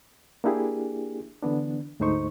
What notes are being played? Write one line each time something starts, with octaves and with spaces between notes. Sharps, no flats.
A#3 D4 E4 G4 G#4
D3 E3 B3 D4
D2 G#2 A3 D#4 C5 C#6